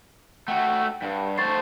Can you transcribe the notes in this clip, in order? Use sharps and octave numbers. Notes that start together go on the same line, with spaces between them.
A3 F#4 F#5 G5
G2
A3 C5 C#6 A6 C7